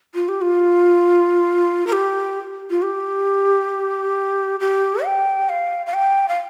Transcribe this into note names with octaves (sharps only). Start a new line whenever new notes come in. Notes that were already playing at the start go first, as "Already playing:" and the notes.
F4
G4
F4
A#4
G4
F4
G4
G4
G5
F5
F5
G5
F5